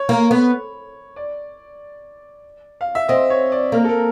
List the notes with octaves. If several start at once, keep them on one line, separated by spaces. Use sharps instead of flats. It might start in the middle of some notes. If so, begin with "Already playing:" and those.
Already playing: C#5
A#3
B3
D5
F5
E5
C4 D#5
C#5
D5
A#3 A#4
A4
A#4